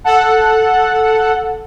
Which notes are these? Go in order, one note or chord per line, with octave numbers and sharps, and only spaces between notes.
A4 F#5